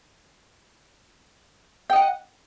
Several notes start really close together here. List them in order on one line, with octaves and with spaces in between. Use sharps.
G5 D#5 F#5